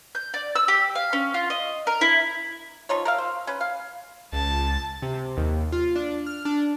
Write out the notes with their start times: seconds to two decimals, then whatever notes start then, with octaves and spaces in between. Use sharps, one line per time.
0.15 G6
0.34 D5
0.55 E6
0.68 G4
0.95 F5
1.13 C#4
1.34 F4
1.50 D#5
1.87 A#4
2.01 E4
2.89 F3 D#4 F4 C#5
3.05 A#4 E5 F5
3.18 C5
3.47 C#4 B4
3.61 F5
4.32 C#2 A5
5.02 C3
5.37 D#2
5.72 F4
5.96 D4
6.26 F6
6.45 D4